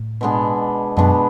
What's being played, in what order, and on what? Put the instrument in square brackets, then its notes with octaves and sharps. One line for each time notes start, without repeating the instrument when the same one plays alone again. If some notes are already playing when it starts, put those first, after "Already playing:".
Already playing: [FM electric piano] A2
[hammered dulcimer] B2 G#3 B3 D4
[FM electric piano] F#2 [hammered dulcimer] B2 G#3 B3 D4